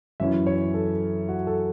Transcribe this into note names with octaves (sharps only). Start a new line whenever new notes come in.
F#2 E3 C#4 E4 E5
C#5
A4
F#4
A4